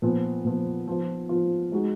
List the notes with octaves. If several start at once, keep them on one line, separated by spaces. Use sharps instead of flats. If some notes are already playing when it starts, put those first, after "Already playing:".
A#2 F3 B3
A#2 F3 B3
F3 B3 F4
F3 B3 F4
G#3 D#4 F#4